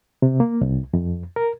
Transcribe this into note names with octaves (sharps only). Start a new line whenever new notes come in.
C3
A#3
C2
F2
A#4